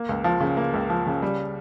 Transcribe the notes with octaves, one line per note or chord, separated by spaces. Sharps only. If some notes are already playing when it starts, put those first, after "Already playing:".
Already playing: A#3
C#2
F3
C#3
A#3
C#2
F3
C#3
G3